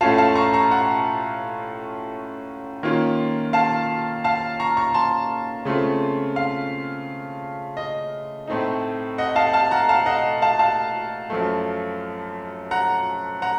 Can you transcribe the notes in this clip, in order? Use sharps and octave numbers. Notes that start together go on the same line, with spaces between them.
A2 A3 C#4 F4 F5 A5
F5 A5
A#5 C#6
A#5 C#6
F#5 A#5
D#3 A#3 C#4 F4
F5 A5
F5 A5
A#5 C#6
A#5 C#6
A5 C6
C#3 A3 C4 F4
F5
D#5
A2 A3 C4 D#4
D#5 F#5
F5 A5
F5 A5
F#5 A#5
F5 A5
D#5 F#5
F5 A5
F5 A5
F#2 F3 A3
F#5 A#5
F#5 A#5